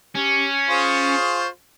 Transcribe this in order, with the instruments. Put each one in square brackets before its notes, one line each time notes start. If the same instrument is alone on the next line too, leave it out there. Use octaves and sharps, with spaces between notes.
[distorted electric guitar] C#4 [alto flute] G4
[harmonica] F4 G#4 C5 [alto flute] C#6